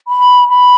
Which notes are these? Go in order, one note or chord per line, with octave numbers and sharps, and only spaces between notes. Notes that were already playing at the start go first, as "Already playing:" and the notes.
B5
B5